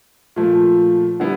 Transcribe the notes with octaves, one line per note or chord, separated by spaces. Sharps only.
A#2 F3 A3
D3 G3 B3 E4